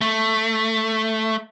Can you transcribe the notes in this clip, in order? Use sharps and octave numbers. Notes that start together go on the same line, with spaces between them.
A3